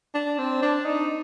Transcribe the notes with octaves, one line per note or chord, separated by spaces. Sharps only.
D4
C4
D4
D#4